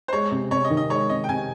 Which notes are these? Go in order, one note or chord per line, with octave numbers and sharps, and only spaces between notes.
C5
G#3 C#5
C3
C3 C#5
D#5
D#3
D#5
G#3 C#5
C3 D#5
G5
C3 G#5